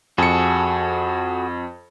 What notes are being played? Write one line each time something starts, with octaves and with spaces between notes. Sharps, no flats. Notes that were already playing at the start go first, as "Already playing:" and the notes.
F2 F#4 G#4 A4 C#7